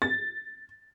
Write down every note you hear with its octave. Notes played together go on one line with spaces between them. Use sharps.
A6